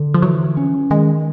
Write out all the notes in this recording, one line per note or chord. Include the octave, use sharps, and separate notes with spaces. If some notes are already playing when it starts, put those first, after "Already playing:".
Already playing: D3
F3
E3 F#3
C#4
D#3 G#3